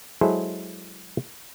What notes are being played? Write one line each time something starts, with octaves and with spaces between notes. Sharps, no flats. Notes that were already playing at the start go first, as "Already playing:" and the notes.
F#3 G#3 E4 G#4 A4 C5